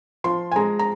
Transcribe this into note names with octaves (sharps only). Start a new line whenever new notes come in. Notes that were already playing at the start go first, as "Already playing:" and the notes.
F3 C6
G#5
G#3 A#5
A#5